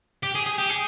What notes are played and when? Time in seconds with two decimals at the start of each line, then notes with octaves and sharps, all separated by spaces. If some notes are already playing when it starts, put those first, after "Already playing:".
0.23 G4
0.35 G#4
0.46 G#4
0.58 G4
0.70 G#4